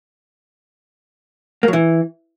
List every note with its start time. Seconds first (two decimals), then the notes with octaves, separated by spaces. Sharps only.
1.63 A#3
1.68 F#3
1.73 E3